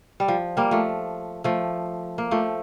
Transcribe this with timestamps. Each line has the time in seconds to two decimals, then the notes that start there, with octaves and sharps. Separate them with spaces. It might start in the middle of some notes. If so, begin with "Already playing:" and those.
0.20 G3
0.28 F3
0.57 G3 A#3
0.71 F3 A3
1.44 F3 A3
2.18 A#3
2.31 F3 A3